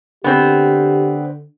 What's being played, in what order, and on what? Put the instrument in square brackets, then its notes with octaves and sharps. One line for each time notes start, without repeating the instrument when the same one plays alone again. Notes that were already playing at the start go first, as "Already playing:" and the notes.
[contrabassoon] D3 [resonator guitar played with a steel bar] B3 C4 [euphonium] G4